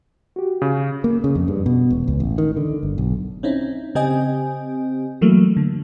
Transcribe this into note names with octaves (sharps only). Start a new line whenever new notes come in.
F#4 G4
C#3
A#3
C#3
F2
G2
B2
E1
C#2
A1
D#3
D3
G1
B1
C4 C#4 D#4 E4
C#3 C4 G4 D#5 G#5
E3 F#3 A3 A#3
D3